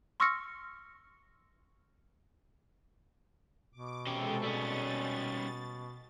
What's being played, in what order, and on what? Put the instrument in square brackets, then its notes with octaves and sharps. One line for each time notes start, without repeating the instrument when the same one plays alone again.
[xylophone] C6 C#6 E6 F6 A#6 C#7
[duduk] B2 [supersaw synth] D6
[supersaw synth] C3 G#3 A4 [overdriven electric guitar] C#4 G4
[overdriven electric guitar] G3 C#4 [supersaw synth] A6